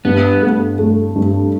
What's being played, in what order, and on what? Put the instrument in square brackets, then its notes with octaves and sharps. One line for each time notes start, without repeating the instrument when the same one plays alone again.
[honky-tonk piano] G2 [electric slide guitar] B3
[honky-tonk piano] A3
A3
G2